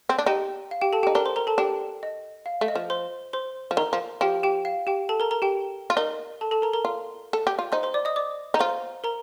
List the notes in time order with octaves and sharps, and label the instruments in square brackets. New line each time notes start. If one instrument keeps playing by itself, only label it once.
[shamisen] C4
D4
[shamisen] D#4 [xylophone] G4 G5
[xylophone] F5
G4 G5
A4 A5
[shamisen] D#4 [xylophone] G4 G5
[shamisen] D4 [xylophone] A#4 A#5
[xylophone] C5 C6
A#4 A#5
A4 A5
[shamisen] D4 [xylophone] G4 G5
[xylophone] D#5
F5
[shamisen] A3
[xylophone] D#5
[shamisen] F3
[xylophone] C5 C6
C5 C6
[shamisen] F3
[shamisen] D#3 [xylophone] A#4 A#5
[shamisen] F3
[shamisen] F3 [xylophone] G4 G5
[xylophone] G4 G5
F5
G4 G5
A4 A5
A#4 A#5
A#4 A#5
G4 G5
[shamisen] F4
[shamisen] D#4 [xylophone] A#4
[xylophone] A4 A5
A4 A5
A#4 A#5
A#4 A#5
[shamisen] F4
A4
G4
F4
[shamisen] D#4 [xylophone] C5 C6
[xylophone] C5 C6
D5 D6
D#5 D#6
D5 D6
[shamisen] D#4 [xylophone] A#5
[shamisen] F4 [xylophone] C5 C6
[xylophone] A#4 A#5